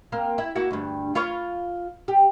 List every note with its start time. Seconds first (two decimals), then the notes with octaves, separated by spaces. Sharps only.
0.12 A#3 C4 F5
0.38 E4
0.56 A#3 E4 F#4
0.71 D2 G2
1.15 F4 B4 C#5
2.08 G4